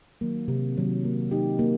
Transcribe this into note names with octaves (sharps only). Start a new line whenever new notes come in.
D#3 F#3 A#3
C3
D#3 F#3 A#3
A#3
D#4 G4
A#3